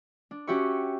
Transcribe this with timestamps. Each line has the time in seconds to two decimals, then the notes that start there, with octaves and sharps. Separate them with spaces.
0.31 D4
0.47 C#4 F#4 G4 E5 C#6